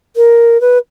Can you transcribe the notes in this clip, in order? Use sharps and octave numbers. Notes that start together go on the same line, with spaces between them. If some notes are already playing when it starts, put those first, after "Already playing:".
A#4
B4